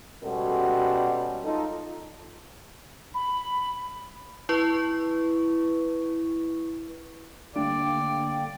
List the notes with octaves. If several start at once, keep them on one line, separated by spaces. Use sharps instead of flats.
B2 G3 G#3 C#4 F#4 A4
D#4 F4 A4
B5
E4 B4 C#6
D3 G3 A3 A#3 D4 D5 G5